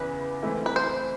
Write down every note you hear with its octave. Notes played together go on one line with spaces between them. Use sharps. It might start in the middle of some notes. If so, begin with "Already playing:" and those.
Already playing: E2 C#3 E3 B4
E3 A3 C4 E4
B4
C5